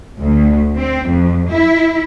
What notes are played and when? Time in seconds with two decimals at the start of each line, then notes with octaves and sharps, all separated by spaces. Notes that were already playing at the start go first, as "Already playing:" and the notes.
0.20 D2
0.79 C4
1.08 F2
1.49 E4